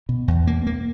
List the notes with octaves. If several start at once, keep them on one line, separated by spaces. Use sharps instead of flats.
B2
E2
A#3
A#3